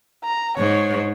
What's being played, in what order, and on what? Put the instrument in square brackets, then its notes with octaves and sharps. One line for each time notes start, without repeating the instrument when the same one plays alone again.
[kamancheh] A#5
[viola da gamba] G#2 [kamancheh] C#5